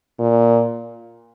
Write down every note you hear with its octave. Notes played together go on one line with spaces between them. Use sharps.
A#2